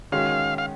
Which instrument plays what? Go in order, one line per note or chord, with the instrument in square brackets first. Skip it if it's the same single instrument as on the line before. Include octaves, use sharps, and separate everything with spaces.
[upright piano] D#3 G#3 C#4 F#4 [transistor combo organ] F5
[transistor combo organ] F5